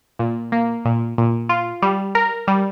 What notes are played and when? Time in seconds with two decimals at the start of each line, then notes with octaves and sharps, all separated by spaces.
0.19 A#2
0.52 A#3
0.85 A#2
1.18 A#2
1.49 F4
1.82 G3
2.15 A#4
2.48 G3